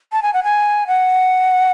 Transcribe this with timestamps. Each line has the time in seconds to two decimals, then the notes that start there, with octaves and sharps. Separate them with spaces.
0.12 A5
0.23 G#5
0.34 F#5
0.44 G#5
0.87 F#5